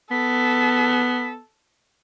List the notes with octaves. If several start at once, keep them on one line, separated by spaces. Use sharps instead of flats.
B3 A4 B6